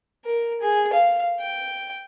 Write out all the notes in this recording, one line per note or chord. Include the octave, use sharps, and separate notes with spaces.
A#4
G#4
F5
G5